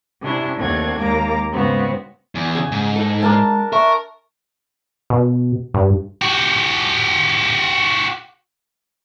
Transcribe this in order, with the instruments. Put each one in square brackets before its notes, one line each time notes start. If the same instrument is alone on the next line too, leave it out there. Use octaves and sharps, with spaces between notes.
[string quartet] C3 C#4 D4 E4
D#2 A3 C4 D4 F#5 G#6
D#2 G#3 A#3 A#5 D6
G#2 C#3 G#3 B3 C4 F#4
[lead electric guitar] E2
[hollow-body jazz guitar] C#3 G#4
[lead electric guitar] G#2
[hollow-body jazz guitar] D#4 A4
[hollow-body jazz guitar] G#3 [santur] D4 A#4 A5
[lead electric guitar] A#4 [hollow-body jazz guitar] E5 [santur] C#6
[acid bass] B2
G2
[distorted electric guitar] F#4 G4